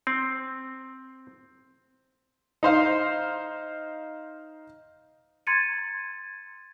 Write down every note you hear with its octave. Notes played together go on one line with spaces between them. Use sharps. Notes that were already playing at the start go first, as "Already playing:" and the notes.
C4
D#4 C5 F5
A#5 C6 G#6 A6 C#7 D#7